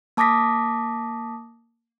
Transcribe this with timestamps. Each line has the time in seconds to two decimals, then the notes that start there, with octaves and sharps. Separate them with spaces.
0.17 A#3 A5 D6 D#6 A#6 B6